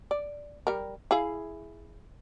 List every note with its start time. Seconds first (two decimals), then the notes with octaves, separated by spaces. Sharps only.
0.11 D5
0.67 G3 A#4
1.11 E4 G#4 F5